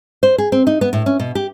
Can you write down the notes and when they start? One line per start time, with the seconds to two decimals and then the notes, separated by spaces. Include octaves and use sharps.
0.23 C5
0.38 G#4
0.52 C4
0.67 D#4
0.81 B3
0.93 A2
1.06 C#4
1.20 B2
1.35 G4